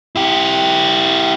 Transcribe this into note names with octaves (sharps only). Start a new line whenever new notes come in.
E4 G4